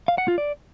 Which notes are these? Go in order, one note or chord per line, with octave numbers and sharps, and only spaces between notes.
F5
F#5
F4
D5